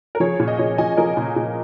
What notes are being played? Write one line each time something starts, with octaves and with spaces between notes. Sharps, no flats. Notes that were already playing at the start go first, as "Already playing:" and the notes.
A#4
F3 G#4 C#5
A#2
D#5
A#2 G#4 C#5
F3 D#5 G#5
F3 A#4 D#5
A#2
A#2